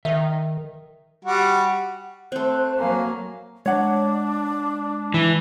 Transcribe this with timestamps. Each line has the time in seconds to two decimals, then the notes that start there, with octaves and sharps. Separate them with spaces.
0.05 D#3 E5
1.25 G3 F#4
2.32 A3 C4 C5 F#6
2.78 F#3 A#3 F5 G#5 A#5
3.66 G#3 D4 C#5 F#5
5.14 E3